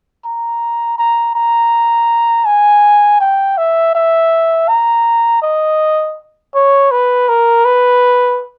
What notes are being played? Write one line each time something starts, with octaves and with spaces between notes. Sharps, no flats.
A#5
A#5
A#5
G#5
G5
E5
E5
A#5
D#5
C#5
B4
A#4
B4